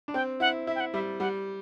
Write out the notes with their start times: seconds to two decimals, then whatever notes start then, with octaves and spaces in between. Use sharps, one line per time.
0.08 D4
0.14 C4 G5
0.40 E4 F#5
0.67 E4 E5
0.75 G5
0.80 F#5
0.94 G3 E5
1.20 G3 F#5